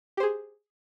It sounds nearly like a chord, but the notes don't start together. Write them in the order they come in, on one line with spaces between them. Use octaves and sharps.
G4 C5 G#4